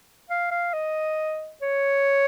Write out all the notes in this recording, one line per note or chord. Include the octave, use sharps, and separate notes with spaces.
F5
F5
D#5
C#5